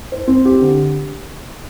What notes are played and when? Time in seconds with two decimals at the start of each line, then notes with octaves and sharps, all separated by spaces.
0.12 C5
0.28 C4
0.45 G4
0.61 D3